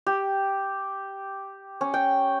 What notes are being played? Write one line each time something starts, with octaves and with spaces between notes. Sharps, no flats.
G4
C#4
G5